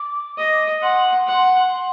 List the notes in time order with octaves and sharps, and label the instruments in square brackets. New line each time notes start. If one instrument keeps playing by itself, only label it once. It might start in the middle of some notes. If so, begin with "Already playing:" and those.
Already playing: [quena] D6
[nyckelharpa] D#5
[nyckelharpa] F#5 [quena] C6
[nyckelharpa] F#5